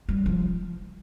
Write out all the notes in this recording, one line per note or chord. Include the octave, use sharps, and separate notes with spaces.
G3
F3